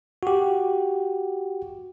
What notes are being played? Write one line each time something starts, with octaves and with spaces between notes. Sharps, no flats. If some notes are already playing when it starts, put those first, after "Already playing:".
F#4 G4